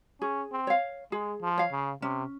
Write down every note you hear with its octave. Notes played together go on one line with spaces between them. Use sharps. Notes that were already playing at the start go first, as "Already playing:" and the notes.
C#4 G#4
C4
C#5 F5
G#3 G#4
F3
C#5 F5
C#3
C3 C#4